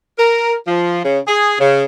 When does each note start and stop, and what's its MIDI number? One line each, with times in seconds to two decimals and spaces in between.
0.17 0.53 70
0.67 1.00 53
1.04 1.18 49
1.27 1.54 68
1.60 1.83 49